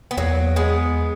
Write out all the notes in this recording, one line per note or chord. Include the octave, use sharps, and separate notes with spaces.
B3
E2 F#3 A#3
G#3 B3